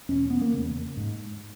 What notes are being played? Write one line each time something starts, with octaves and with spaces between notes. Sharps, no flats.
E2 B2 C#4
B3
A#3
E2 C#3
G#2